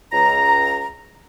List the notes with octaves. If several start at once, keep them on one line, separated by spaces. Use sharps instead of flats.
C#2 A#5